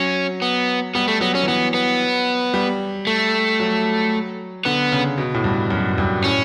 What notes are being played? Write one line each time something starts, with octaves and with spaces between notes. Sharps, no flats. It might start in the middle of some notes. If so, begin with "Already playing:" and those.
Already playing: F#3 C#4
B3
G3 B3
A3
F#3 B3
C#4
E3
F#3 B3
B3
G3
A3
F#3
D3 B3
C#3
B2
A2
G2
F#2
G2
A2 C#4